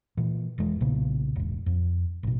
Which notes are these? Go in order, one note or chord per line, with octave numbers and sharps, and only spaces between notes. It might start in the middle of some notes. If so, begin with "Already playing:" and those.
A#2 E3
E1 E2 E3 G#3
B1 A#2 C#3 B3
E1 A1
F2
A1 B2